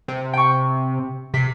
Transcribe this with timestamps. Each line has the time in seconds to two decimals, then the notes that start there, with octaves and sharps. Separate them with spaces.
0.08 C3
0.33 G5 C#6
1.34 C3 B6 C7